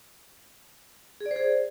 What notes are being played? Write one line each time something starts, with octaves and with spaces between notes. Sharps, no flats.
G#4
D5
C5
G#4